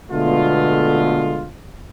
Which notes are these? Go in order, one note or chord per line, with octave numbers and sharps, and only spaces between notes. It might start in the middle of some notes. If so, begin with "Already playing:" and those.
B2 D3 G#3 A3 B3 F4